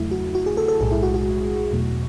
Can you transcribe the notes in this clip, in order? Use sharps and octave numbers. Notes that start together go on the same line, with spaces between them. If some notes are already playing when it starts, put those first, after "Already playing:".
Already playing: E2 C#3 F#3 A3 E4
F#4
F#4
G#4
A4
A4
B1 A2 G#3 G#4
E4
F#4
F#4
E2 B2 F#3 A3